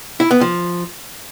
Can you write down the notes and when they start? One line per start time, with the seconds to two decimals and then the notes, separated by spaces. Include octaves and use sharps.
0.20 E4
0.31 B3
0.41 F3